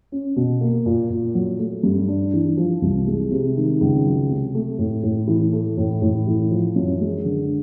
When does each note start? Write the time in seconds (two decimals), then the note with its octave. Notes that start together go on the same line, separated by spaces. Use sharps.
0.12 C#4
0.36 B2
0.61 A#3
0.86 A#2
1.10 A#2
1.34 F#3
1.59 A3
1.83 G2
2.08 D4
2.33 E3
2.57 F3
2.82 C2
3.07 G#3
3.32 C3
3.56 D#3
3.81 C#2
4.05 F#3
4.30 C3
4.55 A3
4.79 A2
5.03 A2
5.27 E3
5.53 A3
5.77 A2
6.02 A2
6.27 E3
6.51 F3
6.76 F#2
7.00 G#3
7.25 D3